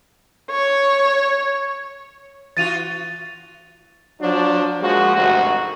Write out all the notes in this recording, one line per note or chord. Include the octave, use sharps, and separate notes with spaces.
C#5
E3 F4 F#4 A6 D#7 F7
F3 F#3 D4
F3 G#3 A#3 F#4
G#1 D2 G2 C3 F#4